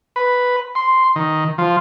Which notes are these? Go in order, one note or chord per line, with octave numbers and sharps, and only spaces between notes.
B4
C6
D#3
F3